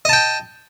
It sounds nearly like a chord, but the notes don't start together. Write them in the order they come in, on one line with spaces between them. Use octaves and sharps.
D#5 A5 G5